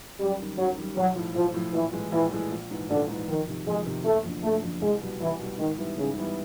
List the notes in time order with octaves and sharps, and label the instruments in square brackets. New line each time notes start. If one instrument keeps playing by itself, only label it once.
[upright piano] F#2 [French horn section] G3
[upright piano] D#3 G3
[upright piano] F#2 [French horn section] F#3
[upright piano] D#3 G3
[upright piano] B1 [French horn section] F#3
[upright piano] A2 F3
[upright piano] B1 [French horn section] F3
[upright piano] A2 F3
[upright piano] A#1 [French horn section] E3
[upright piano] A2 E3 G#3
[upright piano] A#1 [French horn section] E3
[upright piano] A2 E3 G#3
A#1
G#2 E3
[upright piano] A#1 [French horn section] D3
[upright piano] G#2 E3
[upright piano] F2 [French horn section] D#3
[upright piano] C3 D#3
[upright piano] F2 [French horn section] G#3
[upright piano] C3 D#3
[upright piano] F#1 [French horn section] A3
[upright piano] F2 D3
[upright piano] F#1 [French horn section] A3
[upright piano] F2 D3
[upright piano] C2 [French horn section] G#3
[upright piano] B2 G3
[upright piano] C2 [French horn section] E3
[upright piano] B2 G3
[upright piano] G#2 [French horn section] D#3
[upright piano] E3 G3 B3 E4
[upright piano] G#2 [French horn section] C#3
[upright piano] E3 G3 B3 E4